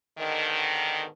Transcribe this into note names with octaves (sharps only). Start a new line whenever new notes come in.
G#2 B2 D3 D#3